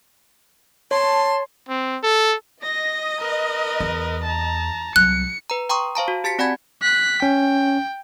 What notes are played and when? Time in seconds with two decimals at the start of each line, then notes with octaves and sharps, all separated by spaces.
0.91 C#5 A5 C6
1.68 C4
2.03 A4
2.64 D#5 A#6
3.19 A#4 B4
3.80 E2
4.24 A5 A#5
4.96 C2 F#3 F#6 C#7
5.50 B4 A#5
5.69 G5 A#5 C6 C#6 D#6
5.95 C5 F5 A5 A#5
6.08 F#4
6.24 G4 A5 A6 B6 C#7
6.39 C4 D5 F#5 G#5 B5 G#6
6.83 F#6 B6
7.22 C#4 G5